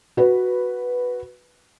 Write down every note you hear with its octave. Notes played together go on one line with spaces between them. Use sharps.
F#4 B4